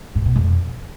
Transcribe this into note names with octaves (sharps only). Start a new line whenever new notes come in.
A2
B2
F2